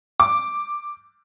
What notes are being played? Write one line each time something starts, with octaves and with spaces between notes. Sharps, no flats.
D6